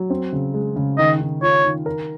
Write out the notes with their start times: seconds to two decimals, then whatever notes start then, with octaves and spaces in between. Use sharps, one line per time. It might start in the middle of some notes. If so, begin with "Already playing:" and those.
Already playing: F#3
0.10 C4
0.33 C#3
0.54 G#3
0.76 C#3
0.98 D#3 D#5
1.21 D#3
1.42 F4 C#5
1.64 D#3
1.86 A#4